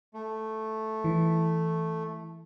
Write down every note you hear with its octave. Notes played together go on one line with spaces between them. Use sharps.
A3
E3